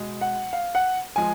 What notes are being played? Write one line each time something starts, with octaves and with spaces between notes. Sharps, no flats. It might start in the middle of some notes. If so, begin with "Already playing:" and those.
Already playing: B2 G#3
F#5
F5
F#5
F3 G#3 G#5